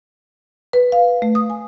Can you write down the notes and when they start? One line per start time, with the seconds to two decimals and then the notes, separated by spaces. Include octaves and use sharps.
0.73 B4
0.92 F5
1.22 A3
1.35 D#6
1.50 G#5